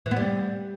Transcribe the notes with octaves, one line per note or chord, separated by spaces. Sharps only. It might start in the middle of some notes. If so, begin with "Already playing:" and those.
E3
B3
G3